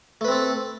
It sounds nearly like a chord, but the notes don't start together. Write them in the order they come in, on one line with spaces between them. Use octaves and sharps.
A3 B4 C4 A4